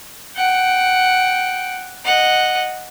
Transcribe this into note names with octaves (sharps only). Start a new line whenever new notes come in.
F#5 G5
D#5 F#5